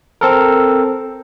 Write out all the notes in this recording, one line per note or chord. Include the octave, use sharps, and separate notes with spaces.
C4 A4 A#4